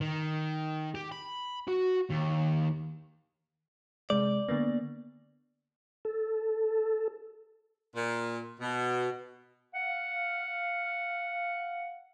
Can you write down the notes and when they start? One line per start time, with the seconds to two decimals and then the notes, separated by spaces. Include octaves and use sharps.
0.01 D#3
0.95 G4
1.12 B5
1.67 F#4
2.10 D#2
4.10 C3 G#3 D5
4.49 D3 A#3 B3
6.05 A4
7.95 A#2
8.60 B2
9.75 F5 F#5